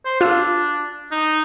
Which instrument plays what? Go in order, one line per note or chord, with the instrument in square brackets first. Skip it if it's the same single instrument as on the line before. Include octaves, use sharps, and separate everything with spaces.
[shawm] C5
[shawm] D4 [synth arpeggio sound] F4 E6
[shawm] D#4